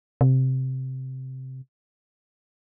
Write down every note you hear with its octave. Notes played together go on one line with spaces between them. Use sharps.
C3